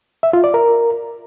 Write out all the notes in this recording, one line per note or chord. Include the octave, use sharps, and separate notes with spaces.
E5
F4
D5
A#4